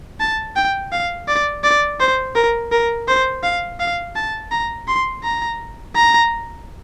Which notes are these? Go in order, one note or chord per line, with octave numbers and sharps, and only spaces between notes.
A5
G5
F5
D5
D5
C5
A#4
A#4
C5
F5
F5
A5
A#5
C6
A#5
A#5